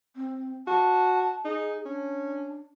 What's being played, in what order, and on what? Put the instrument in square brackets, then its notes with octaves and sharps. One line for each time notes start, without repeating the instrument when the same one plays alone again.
[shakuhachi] C4
[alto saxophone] F#4 [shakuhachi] A5
[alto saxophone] D#4 [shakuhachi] G#4
[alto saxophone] C#4 [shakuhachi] D4